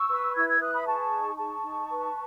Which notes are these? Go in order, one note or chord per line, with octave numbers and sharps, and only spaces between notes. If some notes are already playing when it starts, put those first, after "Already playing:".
Already playing: C#6 E6
B4
E4 E6 G#6
E6 G#6
B4 D#6 F#6
B5 D#6
G#4 A5 C#6
D#4
G#4 A5 C#6
D#4
B4